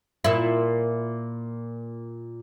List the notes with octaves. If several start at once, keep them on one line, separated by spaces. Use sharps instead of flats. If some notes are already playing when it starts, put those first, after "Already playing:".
A#2 E4